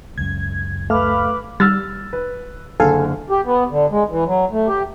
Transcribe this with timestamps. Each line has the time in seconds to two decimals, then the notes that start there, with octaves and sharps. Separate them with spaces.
0.18 C#2 F#2 G#6
0.90 A3 B4 F5 B5 D6 F6
1.60 G3 E6 F6 A6
2.13 B4
2.80 F#1 D3 A4 F5 G#5
3.30 G4
3.45 B3
3.70 D3
3.91 G#3
4.10 E3
4.26 F#3
4.51 A3
4.67 G4